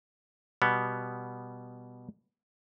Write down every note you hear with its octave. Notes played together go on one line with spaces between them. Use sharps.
B2 G3 B3